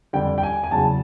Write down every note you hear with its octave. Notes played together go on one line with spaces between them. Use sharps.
F2 D3 G3 G5
G5
G#5
G#5
E2 C#3 F#3 A5